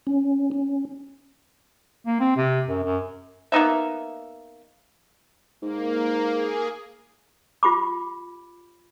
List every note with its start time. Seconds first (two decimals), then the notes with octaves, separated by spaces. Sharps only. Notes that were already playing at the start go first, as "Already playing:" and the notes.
0.07 C#4
0.52 C#4
2.06 A#3
2.20 C4
2.36 C3
2.68 F#2
2.84 F#2
3.52 A#3 B3 D#4 E5
5.62 G#2 A#3
6.34 G#4
7.63 F4 G4 B5 D6